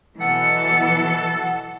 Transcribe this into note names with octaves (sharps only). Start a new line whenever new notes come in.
B2 E3 F#3 A4 F#5 C#7